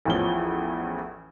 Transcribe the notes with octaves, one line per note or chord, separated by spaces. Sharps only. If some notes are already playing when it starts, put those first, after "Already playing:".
A1 E2 E3 F3 C#4 G7